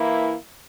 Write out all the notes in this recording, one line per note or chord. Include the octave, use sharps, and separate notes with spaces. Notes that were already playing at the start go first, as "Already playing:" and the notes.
Already playing: E3 A#3 E4